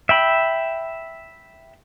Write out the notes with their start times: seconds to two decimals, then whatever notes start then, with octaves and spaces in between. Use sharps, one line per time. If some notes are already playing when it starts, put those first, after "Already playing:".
0.09 E5 G5 B5